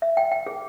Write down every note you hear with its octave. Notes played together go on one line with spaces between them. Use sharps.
E5
G5
G5
G#4